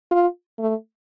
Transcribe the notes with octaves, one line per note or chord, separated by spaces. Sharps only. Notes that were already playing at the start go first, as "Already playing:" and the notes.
F4
A3